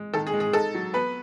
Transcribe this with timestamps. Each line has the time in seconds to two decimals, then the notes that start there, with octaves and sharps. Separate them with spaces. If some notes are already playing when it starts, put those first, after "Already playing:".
Already playing: G#3
0.14 D#3 A4
0.27 G#4
0.33 G#3
0.40 G#4
0.53 D#4 A4
0.75 F#3
0.93 B3 B4